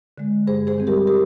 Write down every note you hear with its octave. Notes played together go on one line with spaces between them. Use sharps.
D3 G#3
G2 G#4 C5
G#4 C5
D#3 G3 C4
G4 A#4
G4 A#4